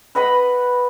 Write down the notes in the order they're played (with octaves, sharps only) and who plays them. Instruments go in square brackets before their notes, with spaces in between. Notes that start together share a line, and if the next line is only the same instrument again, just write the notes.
[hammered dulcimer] B4 D#5 F#5 B5